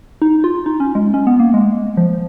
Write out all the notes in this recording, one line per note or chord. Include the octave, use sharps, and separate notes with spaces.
D#4
F4
D#4
C#4
G#3
C#4
B3
A#3
G#3
F3